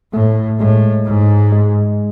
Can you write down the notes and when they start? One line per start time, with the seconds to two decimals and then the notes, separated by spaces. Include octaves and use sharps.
0.13 A2 A3
0.59 A2 G#3
1.06 G#2
1.52 G#3